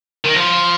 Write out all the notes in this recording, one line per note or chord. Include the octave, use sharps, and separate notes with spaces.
D#3
F3